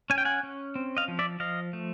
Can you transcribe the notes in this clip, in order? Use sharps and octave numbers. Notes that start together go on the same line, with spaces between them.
C#4 G#5
G5
F#5 G#5
C#4
C4
D#5 F5
F3
D5 E5
F3 D#5 F5
A3